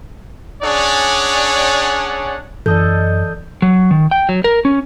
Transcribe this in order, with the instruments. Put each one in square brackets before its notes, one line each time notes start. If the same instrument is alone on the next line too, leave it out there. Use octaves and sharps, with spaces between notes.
[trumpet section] C#4 D4 G#4 C#5 D5 F#5
[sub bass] F#2 [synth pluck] E3 D#5 [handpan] A4 [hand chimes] D5 D#6 G6
[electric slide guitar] F#3
D#3
G5
F#3
A#4
C#4